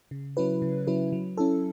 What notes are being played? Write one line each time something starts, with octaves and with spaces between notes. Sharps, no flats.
C#3
F#3 C#4 E4 B4
C#3
F#3 C#4 E4 B4
F#3
C#4 E4 A4